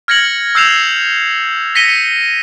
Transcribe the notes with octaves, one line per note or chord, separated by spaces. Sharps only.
F6 G#6 A#6 C#7 F#7
E6 F6 G6 C7 E7 F7
A#6 B6 C#7 D#7 G7